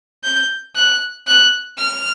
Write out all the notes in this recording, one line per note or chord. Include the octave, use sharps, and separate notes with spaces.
G6
F#6
F#6
F6